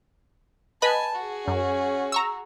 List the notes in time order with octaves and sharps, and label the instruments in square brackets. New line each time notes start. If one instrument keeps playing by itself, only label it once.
[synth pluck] B4 D#5 B5 [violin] G#5 A5
[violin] F#4 G#4
[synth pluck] F#2 [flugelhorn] C#4
[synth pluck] A#5 C#6 E6